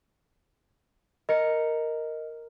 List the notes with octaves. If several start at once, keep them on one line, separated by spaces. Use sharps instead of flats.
A#4 D#5 C#7